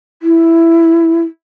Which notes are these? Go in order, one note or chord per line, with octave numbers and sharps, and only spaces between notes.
E4